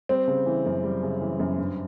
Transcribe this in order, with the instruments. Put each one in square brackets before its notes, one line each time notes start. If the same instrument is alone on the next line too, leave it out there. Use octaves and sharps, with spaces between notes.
[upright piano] G3 C4
C#3
E3
F#2
G3
C#3
E3
F#2
G2